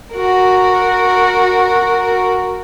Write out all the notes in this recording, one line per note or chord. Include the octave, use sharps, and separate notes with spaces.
F#4 A#4